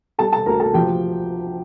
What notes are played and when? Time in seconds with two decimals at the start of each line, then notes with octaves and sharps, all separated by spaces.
0.18 G3 A4 A5
0.33 A4 A5
0.46 D2 A#4 A#5
0.60 A4 A5
0.74 F3 G4 G5